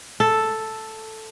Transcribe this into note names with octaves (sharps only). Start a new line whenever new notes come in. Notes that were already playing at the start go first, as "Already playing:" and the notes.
A4